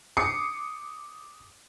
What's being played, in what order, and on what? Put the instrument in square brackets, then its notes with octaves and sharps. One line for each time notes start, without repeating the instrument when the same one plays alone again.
[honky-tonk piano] D6 D#6 C7 C#7